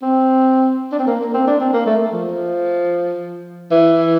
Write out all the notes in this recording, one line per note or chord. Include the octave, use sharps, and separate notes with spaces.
C4
D4
C4
A#3
A#3
C4
D4
C4
A#3
A3
F3
E3